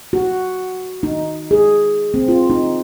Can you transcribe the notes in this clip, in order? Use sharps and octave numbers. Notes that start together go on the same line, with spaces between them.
F#4
D#4
G#4
C4
F4
D#4